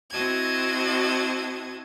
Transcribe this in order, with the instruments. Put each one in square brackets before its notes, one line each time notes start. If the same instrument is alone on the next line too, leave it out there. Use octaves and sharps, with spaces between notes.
[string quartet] C4 E4 F#4 D#5 A5 G#6